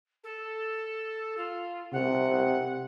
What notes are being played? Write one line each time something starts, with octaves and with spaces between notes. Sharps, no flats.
A4
F4
C3 F#5